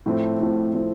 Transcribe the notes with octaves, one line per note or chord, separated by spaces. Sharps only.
A2 F3 A3 C4
A2 F3 A3 C4
A2 F3 A3 C4